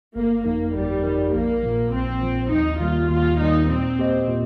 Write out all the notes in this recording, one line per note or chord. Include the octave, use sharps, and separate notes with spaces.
G1 A#3
F2 F3 A#3 D#4 A#4
G1 G3
F2 F3 D#4 A#4
A#1 A#3
A#2 F3
A#1 C4
A#2 F3
D#2 D#4
D#3 G3 A#3 F4
D#2 F4
D#3 G3 A#3 D#4
A#2 C4
A#3 G4 C5 D#5
A#2